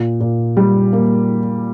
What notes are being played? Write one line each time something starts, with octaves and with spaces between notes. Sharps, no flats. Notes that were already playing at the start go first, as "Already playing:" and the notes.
Already playing: A#2
A#2
G3
A#3